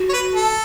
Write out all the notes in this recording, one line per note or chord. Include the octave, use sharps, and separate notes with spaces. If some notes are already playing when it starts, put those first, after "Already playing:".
Already playing: F#4
C#5
B4
A4